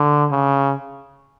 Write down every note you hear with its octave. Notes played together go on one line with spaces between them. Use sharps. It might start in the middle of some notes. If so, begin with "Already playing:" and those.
Already playing: D3
C#3